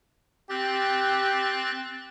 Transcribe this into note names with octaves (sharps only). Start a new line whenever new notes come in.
C4 G4 F#6 A6